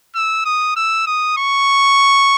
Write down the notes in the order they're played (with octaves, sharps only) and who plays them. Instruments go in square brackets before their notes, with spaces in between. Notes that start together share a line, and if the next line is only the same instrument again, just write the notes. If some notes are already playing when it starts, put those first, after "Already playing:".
[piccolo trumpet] E6
D#6
E6
D#6
C#6